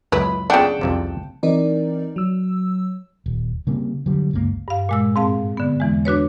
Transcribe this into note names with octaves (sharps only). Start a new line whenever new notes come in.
C#2 F#2 E4 B4 B5
C#3 D4 F#5 G5 A5
C2 F2 C3
E3 C4 D#4 A#4 D5
F#3 E6
D#1
C#3 G3 A#3 C4
D3 F#3 G3
G1 C#2 C3 A#3
G2 F5
A#2 G#3 E6
G#2 C4 F5 A5
D3 B3
E2 E3 G#3
D4 F#4 B4 C#5